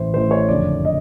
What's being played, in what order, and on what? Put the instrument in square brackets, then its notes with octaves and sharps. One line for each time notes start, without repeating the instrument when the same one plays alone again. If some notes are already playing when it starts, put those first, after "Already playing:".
Already playing: [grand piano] A1 A2 E3 C5
A1 A2 E3 C5
C#5
F#1 F2 D3 D5
D#5